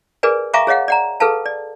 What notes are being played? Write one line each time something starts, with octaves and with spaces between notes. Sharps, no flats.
G#4 A#4 B4 D5 G#5
E5 F5 G#5 A#5 C#6 D6
G#4 C#5 D#5 F5 F#5
D5 F#5 A#5
G#4 A4 B4 F5 A5
D5